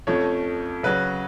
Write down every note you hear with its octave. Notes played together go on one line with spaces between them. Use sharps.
F2 F3 A3 C#4 C#5
C#3 F#3 C#4 B4